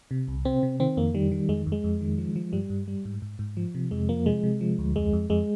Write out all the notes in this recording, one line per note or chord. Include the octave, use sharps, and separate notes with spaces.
C3
C2
C3 C4
C3
D#3 C4
F2 A#3
D#3 G3
D#3
F2 G#3
F2
G#3
F2
D#3
F3
F3
G2 G3
G2
G3
G#2
G#2
G#2
F3
C3
F2 G#3
F3 A#3
C3 G#3
C3
F3
D2
F2 G#3
F2
F2 G#3